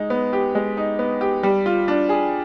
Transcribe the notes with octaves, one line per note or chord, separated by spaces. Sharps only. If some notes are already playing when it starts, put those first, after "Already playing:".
Already playing: G#3 D#4
B3
G4
G#3
D#4
B3
G4
G3
F4
D4
G#4